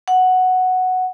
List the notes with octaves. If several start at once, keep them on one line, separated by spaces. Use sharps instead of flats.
F#5